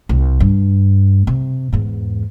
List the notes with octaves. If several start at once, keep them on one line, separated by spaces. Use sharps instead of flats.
C2
G2
C3
E2 G#2